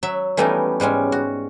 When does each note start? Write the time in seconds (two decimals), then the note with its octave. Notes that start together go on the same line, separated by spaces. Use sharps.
0.03 F#3 E5
0.37 E3 G3 A3 B3 C#4 D#4
0.80 G#2 G3 G#3 C#4
1.12 F#4